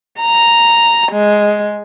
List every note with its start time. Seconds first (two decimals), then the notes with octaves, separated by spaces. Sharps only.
0.21 A#5
1.12 G#3